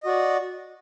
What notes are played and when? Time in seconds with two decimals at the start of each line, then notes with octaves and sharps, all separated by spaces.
0.03 D#5
0.06 F#4
0.08 D5